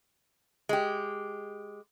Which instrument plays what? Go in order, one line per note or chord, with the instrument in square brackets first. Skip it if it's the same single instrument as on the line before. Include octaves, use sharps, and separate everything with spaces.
[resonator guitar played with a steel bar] G#3 G4